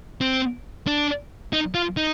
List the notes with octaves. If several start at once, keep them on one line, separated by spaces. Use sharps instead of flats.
C4
D4
D#4
F4
D#4